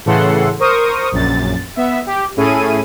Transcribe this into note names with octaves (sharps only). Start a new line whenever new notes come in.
A2 C#3 E3 A4 F#5 C6
A#4 C5 C#6 D#6
A#1 F#2 A6
B3 E5
G4
A2 C#4 E4 G#4 A4 D#7